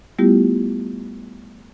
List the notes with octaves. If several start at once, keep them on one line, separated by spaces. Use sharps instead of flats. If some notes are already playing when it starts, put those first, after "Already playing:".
G3 A3 B3 E4 F4 G4